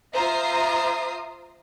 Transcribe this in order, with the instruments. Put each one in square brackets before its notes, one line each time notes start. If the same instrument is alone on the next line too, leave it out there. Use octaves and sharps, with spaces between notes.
[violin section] F4 C5 E5 A#5 D#6 C7